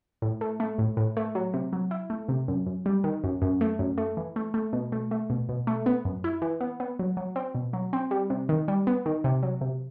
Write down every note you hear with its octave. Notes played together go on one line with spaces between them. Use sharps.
A2
A3
A3
A2
A2
A3
F#3
C3
F#3
E4
A3
C3
F#2
F#2
G3
D#3
F#2
F#2
A3
F#2
A3
E3
A3
A3
B2
A3
A3
B2
B2
A3
B3
F#2
E4
E3
B3
B3
F#3
F#3
C4
B2
F#3
C4
G3
C3
D#3
G3
B3
D#3
C3
F#3
C3